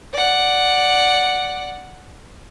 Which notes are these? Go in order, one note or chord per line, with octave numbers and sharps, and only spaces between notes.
D5 F#5